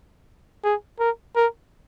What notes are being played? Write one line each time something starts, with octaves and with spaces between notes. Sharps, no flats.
G#4
A#4
A#4